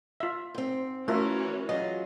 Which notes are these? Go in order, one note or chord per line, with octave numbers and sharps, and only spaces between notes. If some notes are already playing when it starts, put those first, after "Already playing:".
F4 E5
G#2 C4
E3 A3 C#4 F4 F#4 A#4 E5
F#3 F4 G#4 D#5